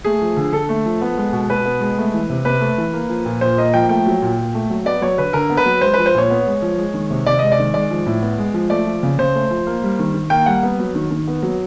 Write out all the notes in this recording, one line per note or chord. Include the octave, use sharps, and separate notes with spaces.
A3 G#4
F3
D3
D3 A4
A3
F3
B3
G#3
B2
B2 B4
B3
G#3
A3
E3
C3
C3 B4
A3
E3
A#3
F3
A#2
A#2 C5
A#3 D#5
F3 G5
A3 G5
F#3
A#2
A#2
A3
F#3
B3 D5
F#3 C#5
D3 B4
D3 A#4
B3
B4
F#3
G#3 C5
F3 B4
C5
A#2 C#5
B3
G#3
F3
G#3
D#3
C3
C3 D5
G#3 D#5
D5
D#3
G#3 D5
F3
A2
B3
G#3
F3
A3 D5
F3
C#3
C#3 C5
A3
F3
A#3
G3
D#3
D#3
A#3 G5
G3 F#5
B3
F#3
D#3
D#3
B3
F#3